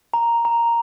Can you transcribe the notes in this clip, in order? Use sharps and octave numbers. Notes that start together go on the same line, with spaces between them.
A#5
A#5